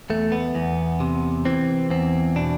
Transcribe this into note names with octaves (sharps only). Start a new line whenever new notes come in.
E2 A3
B3
E2
C3
E3 C4
E2 C4
B2 D4